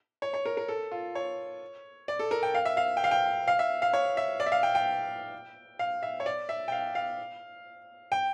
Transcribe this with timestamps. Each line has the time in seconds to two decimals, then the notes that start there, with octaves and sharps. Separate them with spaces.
0.22 C#5
0.34 C#5
0.45 A#4
0.57 A#4
0.68 A4
0.92 F4
1.15 C#5
2.08 D5
2.19 A4
2.31 A#4
2.43 G5
2.55 F5
2.65 E5
2.77 F5
2.97 G5
3.04 F5
3.11 G5
3.48 F5
3.59 E5
3.82 F5
3.93 C#5
4.17 E5
4.40 D5
4.46 E5
4.52 F5
4.63 G5
4.75 G5
5.79 F5
6.03 E5
6.20 C#5
6.26 D5
6.49 E5
6.68 G5
6.72 F5
6.95 F5
8.12 G5